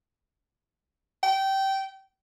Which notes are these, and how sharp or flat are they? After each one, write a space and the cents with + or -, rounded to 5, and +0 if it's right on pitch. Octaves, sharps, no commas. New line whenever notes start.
G5 -20